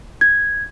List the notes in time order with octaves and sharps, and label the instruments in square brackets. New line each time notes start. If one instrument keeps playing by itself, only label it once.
[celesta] G#6